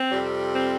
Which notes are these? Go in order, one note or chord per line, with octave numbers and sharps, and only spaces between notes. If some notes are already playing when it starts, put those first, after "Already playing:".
Already playing: C4
F2 C3 G3
C4